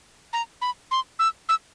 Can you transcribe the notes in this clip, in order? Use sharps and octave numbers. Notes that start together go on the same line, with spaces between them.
A#5
B5
C6
E6
E6